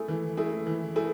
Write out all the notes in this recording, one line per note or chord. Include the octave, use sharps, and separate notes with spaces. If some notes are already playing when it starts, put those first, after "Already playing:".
Already playing: A3 E4 G#4
E3
A3 E4 G#4
E3
A3 E4 G#4